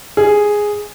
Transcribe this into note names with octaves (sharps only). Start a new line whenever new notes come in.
G#4